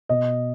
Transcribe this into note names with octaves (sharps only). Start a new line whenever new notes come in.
B2 D#5